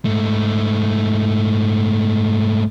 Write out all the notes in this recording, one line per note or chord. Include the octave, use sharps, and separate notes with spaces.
G#2 A3